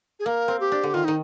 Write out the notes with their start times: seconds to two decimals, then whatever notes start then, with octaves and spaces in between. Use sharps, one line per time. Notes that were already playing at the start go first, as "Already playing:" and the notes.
0.20 G#4
0.26 A#3 A#4
0.48 C4
0.60 G4
0.72 D4
0.83 D3
0.94 D#3 F4
1.05 D#3 D#4